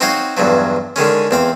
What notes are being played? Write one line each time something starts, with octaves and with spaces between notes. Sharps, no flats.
C4 D#4 F#4 C5 C#5 F5
E2 G2 F3 F#3
D3 D#3 G#3 C#4
E2 C4 F5